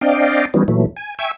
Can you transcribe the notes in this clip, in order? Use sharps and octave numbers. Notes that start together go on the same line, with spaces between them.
C4 D4 D5 D#5 F5 G5
E3 F3 G3 B3 C#4 D#4
A#2 E3 F#3 A3
G#5
E5 G5 G#5 C#6 E6